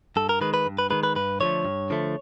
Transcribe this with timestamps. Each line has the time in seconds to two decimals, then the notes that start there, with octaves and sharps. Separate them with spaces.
0.16 G2 A4
0.29 A#4
0.41 D#3 G#3 B4
0.54 B4
0.66 G2
0.78 B4
0.90 D#3 G#3 B4
1.03 B4
1.16 G2 B4
1.40 D3 F3 A3 C#5
1.65 G2
1.90 D3 F3 A3